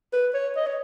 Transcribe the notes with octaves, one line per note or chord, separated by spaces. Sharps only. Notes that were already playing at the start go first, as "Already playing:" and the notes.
B4
C#5
D#5
C#5